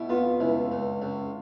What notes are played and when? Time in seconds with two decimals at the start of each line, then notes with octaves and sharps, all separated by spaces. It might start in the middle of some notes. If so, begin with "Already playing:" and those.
Already playing: B2 E4
0.09 B3 F4
0.40 C#2 E4
0.71 C#2
1.02 C#2